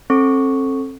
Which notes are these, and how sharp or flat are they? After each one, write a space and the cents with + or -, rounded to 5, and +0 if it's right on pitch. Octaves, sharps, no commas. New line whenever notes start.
C4 +35 A4 +0 C#6 +0